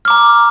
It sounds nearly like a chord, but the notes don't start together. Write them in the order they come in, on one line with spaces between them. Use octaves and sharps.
F6 D6 A#5